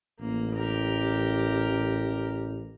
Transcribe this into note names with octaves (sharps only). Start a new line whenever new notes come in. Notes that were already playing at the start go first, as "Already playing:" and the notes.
A1 A#3
G4 A#4